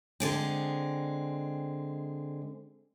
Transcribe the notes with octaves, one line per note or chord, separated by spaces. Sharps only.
D3 G#3 C4